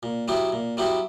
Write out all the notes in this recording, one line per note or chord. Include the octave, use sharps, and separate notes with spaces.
A#2
F#3 B3 E4 G4
A#2
F#3 B3 E4 G4